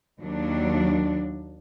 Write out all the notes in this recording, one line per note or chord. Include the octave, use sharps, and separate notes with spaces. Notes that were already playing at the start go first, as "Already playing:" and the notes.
D#2 D#3 F#3 D4